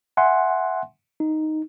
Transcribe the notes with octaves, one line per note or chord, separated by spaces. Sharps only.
E5 F#5 G#5 C6
D#4